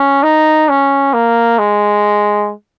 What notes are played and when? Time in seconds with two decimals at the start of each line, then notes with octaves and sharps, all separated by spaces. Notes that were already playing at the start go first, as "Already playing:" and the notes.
Already playing: C#4
0.23 D#4
0.69 C#4
1.13 A#3
1.59 G#3